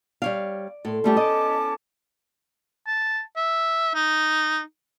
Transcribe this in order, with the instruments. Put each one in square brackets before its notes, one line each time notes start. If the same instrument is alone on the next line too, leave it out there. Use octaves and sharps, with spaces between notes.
[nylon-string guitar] G3 C#5 F5 [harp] D5
[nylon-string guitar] A2 [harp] A4 C6
[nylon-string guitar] G3 A3 G4 [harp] B3 E4 [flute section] C#4 A5 D6
[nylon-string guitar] D#5 [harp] G6 A6 D7
[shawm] A5
E5
D#4